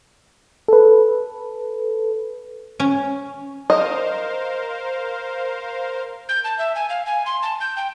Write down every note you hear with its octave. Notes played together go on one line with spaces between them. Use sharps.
A4 B4
C#4
A#4 C5 D#5 F5
G6
A5
E5
G#5
F5
G#5
C6
A5
G6
G5